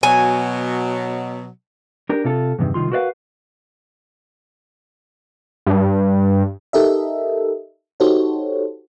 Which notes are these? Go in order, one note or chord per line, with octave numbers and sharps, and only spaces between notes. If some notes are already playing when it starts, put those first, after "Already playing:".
B2 F#3 G#5
D4 G4 A#4
C3 F4 A4
E2 G2 C3 D#3
C2 A#2 D#3 F4 C6
F#4 A#4 B4 D5 F5 F#5
G2
D#4 G4 A4 A#4 D#5 E5
D#4 F#4 G4 A4 C5 C#5